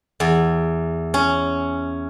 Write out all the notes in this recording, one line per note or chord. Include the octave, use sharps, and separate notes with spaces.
E2
C#4